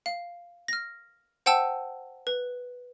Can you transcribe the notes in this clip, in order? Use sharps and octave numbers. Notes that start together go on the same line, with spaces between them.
F5
F6 A#6
C5 F#5 G5 A5 E6
B4